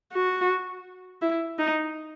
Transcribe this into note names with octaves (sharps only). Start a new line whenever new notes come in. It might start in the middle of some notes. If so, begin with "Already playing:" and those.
F#4
E4
D#4